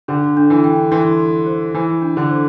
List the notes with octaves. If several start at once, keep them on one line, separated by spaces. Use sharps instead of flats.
D3 D4
D4
E3
G5
E3 C6
C6
C5
E3 C5
D4
D3
C5